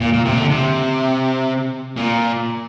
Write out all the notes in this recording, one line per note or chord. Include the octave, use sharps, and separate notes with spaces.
A#2
A#2
C3
D3
C3
A#2